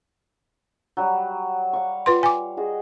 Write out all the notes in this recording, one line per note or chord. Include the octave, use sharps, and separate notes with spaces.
F#3 G3
F5 C#6
F4 B4 C6
G#5 D6
F#4 G#4 D#5